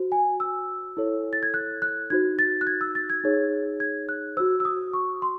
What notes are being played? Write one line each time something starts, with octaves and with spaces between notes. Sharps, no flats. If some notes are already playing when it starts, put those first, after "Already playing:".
Already playing: F#4 C5
G#5
E6
E4 A4 C#5
A6
G#6
F#6
F#6
D#4 F#4 C5 G#6
A6
F#6
G#6
E6
A6
G#6
D#4 G#4 C#5
G#6
F#6
F#4 C5 E6
E6
D#6
C#6
C6